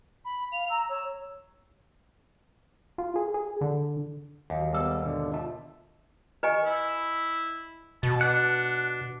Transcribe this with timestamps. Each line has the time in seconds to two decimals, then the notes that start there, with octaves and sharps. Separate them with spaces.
0.25 B5
0.52 F5 F7
0.70 A#5 E6
0.90 C#5 E6
2.98 F4
3.16 G#4
3.34 G#4
3.61 D3
4.50 D#2 F#3
4.72 G3 B3 G#4 A4
5.04 G#2 B2 D3
5.32 F4 D#5 E5 A5
6.43 B4 D#5 G#5 C#6
6.65 E4
8.03 B2 A5
8.21 D4 F#5